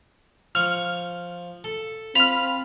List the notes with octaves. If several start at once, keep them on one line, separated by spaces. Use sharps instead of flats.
F3 C#6 F6
A4
C4 F4 B5 F6 F7